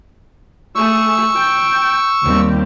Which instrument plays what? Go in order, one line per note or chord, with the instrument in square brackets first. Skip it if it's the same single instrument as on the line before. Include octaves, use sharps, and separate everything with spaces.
[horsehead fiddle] A3 G#4 [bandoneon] C#6 E6
[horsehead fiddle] G5
[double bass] D#2 G3 [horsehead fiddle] C4 G4